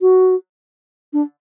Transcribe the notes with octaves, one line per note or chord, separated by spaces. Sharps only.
F#4
D4